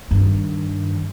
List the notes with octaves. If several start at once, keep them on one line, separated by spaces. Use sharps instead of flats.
G2 D#3